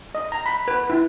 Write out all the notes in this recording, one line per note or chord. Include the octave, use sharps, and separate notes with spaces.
D#5
A#5
B5
B4
E4